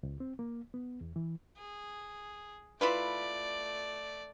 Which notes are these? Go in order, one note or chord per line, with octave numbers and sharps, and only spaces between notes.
C#2
C4
A#3
B3
E2
E3
G#4
A3 E4 F4 B4 D5